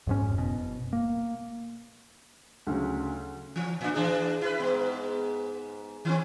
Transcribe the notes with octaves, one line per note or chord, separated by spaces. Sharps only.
F2 G#2 C#4
F#1 B2
A#3
D2 C#3 F#3
E3
A2 D4
E3 D4 G#4
E4 B4
G#2 B3
D#3 C4